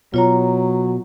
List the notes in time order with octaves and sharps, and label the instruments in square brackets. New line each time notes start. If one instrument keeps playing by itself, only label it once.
[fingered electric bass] B2 [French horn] F#3 [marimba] F4 C#5 A#5